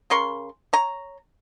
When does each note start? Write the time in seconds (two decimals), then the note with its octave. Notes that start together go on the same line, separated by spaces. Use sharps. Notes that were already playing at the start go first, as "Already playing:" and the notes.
0.10 C#3 A#4 C6 C#6
0.73 C#5 A#5